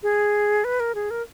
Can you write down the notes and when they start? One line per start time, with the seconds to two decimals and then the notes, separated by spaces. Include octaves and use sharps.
0.03 G#4
0.64 B4
0.80 A#4
0.95 G#4
1.11 A#4